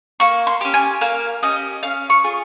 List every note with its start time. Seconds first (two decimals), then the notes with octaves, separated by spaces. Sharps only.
0.20 A#3 C#6
0.47 C6
0.61 C#4 G4
0.74 G#5
1.01 A#3 F5
1.43 C#4 G4 D#5
1.83 C#4 F5
2.10 C#6
2.24 F4 G#4